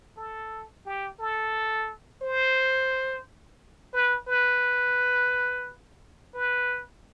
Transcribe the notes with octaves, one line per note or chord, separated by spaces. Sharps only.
A4
G4
A4
C5
B4
B4
B4